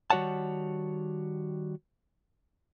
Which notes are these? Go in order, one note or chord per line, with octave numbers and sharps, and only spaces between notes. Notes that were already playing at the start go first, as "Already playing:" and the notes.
D#3 G3 F#4 C#5 F#5 A5